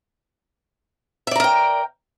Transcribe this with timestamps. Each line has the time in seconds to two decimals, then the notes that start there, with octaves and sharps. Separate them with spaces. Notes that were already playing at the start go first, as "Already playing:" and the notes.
1.27 E5
1.31 D5
1.36 A#5
1.40 A#4
1.44 G5